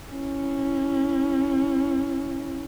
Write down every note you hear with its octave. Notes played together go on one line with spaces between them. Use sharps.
C#4 E4